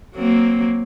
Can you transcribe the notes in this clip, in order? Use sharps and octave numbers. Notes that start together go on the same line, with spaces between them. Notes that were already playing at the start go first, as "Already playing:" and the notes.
F#3 A#3 C4